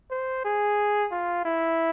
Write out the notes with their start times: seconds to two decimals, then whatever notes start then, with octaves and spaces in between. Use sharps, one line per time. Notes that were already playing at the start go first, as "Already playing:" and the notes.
0.11 C5
0.45 G#4
1.11 F4
1.45 E4